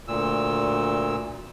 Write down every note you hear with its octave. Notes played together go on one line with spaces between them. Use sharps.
D2 A#2 E6